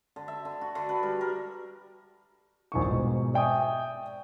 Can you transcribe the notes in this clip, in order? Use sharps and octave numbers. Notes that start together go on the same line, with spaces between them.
D3
E5
D3
F#4
D3
B4
G3
A#4
A#1 D#3 C#6
G#2 B2
D5 E5 G5 G#5 C#6 D#6